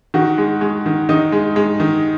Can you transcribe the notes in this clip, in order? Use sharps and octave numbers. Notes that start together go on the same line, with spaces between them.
D#3 F#4
G#3
G#3
D#3
D#3 D#4
G#3
G#3
D#3